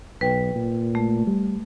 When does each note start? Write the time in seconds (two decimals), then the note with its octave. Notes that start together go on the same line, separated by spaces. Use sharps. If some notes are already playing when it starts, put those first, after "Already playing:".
0.21 B1 B4 G5
0.55 A#2
0.95 A3
1.27 G3